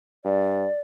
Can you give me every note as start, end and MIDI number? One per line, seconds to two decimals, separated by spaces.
0.25 0.67 43
0.25 0.80 74